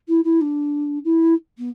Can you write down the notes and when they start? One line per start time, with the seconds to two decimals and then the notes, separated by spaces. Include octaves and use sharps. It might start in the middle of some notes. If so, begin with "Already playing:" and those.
0.08 E4
0.24 E4
0.41 D4
1.04 E4
1.57 B3